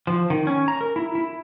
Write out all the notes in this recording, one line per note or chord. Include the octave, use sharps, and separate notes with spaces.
F3
D#3
C#4
A#5
A#4
E4
E4